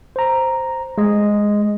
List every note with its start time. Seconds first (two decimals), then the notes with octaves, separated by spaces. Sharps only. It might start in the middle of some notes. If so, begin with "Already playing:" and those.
0.16 C5 A#5
0.98 G#3 D#5